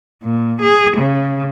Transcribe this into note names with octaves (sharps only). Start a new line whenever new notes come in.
A#2
G#4
C#3